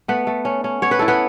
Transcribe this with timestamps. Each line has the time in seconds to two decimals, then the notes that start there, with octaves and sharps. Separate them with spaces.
0.08 A3 B3 B4
0.27 A3
0.45 C#4
0.64 C#4
0.82 B3 C#5
0.91 B4
0.99 E4 A4
1.08 B3 B4